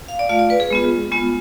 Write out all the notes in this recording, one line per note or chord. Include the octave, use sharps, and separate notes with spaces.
F5
D5
A3 F4 F5
D5
B4
G#4
G#3 B3 F4
G#3 B3 F4